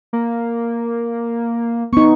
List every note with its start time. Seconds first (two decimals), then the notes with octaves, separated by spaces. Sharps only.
0.13 A#3
1.93 B3 D#4 C#6